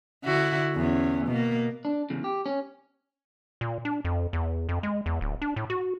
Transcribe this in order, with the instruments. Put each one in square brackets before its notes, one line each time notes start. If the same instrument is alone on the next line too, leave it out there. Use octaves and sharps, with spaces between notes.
[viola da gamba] D3 E4 F#4
E2 C#4
B2 A#3
[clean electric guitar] D4
E2 A2 C#3
G4
C#4
[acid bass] A#2
D4
F2
E2
F2
G#3
E2
D1
D4
A2
F#4